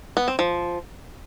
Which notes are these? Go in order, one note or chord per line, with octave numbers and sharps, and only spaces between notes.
B3
C4
F3